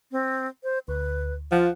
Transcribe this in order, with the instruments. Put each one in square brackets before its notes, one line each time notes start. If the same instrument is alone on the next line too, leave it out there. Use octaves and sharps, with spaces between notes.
[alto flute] C4
C5
[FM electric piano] D2 [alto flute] B4
[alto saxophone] F3 [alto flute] F4 [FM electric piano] F#5